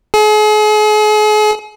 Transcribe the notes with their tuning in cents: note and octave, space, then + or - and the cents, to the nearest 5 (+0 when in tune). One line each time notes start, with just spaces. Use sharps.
G#4 +40